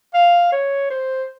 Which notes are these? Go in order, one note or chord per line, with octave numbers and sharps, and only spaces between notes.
F5
C#5
C5